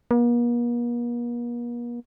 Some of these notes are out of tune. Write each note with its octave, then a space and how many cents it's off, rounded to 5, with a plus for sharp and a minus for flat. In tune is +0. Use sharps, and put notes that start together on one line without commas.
A#3 +45